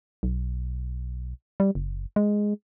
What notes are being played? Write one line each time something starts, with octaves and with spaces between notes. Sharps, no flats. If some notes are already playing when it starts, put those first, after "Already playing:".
B1
G3
F#1
G#3